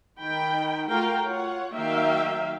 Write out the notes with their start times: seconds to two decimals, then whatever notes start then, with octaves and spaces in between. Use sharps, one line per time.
0.20 D#3 G5 B5
0.90 A3 F4 F#4 A#4 F5 G5
1.26 F4 C#5 F#5
1.75 D#3 F#3 A#3 E5 F5 G5